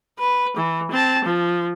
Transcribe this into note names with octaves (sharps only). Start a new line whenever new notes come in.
B4
E3
C4 A5
F3